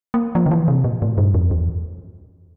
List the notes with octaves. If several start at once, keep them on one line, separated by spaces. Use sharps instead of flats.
A#3
F3
D3
E3
C3
A#2
A2
G2
F2
E2